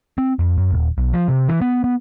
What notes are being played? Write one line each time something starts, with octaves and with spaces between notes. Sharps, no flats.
C4
F2
F#2
D#1
B1
F3
C3
E3
B3
B3